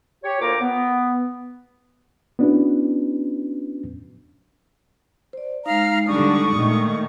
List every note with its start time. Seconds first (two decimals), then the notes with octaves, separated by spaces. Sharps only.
0.24 G4 C#5
0.40 D2 A#3 F4 C5 A#5 D6
0.61 B3
2.39 B3 C#4 D4 E4 F#4 B4
5.33 C5 D5
5.66 G#3 D#4 F5 A#5 F6
6.07 D3 G3 D4 C#6 D#6
6.55 A#2 D#3 A3